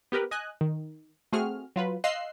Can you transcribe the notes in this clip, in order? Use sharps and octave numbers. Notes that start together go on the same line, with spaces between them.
B3 G4 A#4 B4
D#5 G#5 F#6
D#3
A3 C4 F#4 G#4 F6
F#3 F4 B4
D#5 F5 C6 E6 F#6 C7